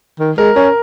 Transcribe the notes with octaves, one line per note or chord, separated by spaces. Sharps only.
D#3
G#3 A#4
C#4 A#4